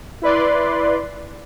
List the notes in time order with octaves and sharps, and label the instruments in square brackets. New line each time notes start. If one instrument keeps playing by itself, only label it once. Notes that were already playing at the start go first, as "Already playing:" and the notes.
[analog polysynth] E4 B4 D5 C6